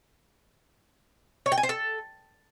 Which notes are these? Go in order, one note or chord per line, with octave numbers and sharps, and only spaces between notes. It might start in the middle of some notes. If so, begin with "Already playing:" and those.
C#5
G5
G#5
C5
A4